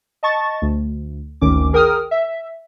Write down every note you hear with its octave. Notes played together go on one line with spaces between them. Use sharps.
D#5 A5 C#6 A6
D2
G#1 D2 D#3 C#4 D6
G#4 A#4 G5 D#6 F6
E5